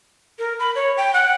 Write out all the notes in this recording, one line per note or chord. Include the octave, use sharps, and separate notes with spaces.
A#4
B5
C#5
G5
F#5